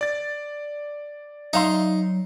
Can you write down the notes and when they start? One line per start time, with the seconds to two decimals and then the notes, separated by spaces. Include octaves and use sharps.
0.01 D5 A6
1.53 F#3 D#4 E5 F5 C6